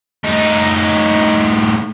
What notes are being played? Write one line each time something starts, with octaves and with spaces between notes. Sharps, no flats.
A2 D#4